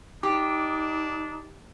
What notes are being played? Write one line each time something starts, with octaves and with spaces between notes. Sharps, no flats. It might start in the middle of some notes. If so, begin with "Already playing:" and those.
D4 D#4 G4 D6